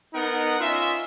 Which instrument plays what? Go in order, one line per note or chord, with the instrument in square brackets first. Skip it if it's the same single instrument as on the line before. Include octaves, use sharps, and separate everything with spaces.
[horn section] B3 D#4 A#4 D#5 F#5
C#4 F4 D#5 E5